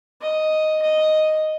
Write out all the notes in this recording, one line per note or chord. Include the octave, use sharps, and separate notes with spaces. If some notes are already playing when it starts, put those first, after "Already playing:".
D#5
D#5